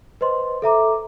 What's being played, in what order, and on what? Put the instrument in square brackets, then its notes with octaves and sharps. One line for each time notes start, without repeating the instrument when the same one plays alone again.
[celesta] B4 C5 D#5 C6
A4 E5 A#5 D6